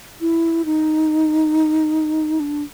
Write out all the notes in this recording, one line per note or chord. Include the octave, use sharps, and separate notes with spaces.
E4
D#4
D4